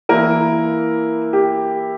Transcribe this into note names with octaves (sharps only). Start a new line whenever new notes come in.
E3 A#3 E4 A#4
G4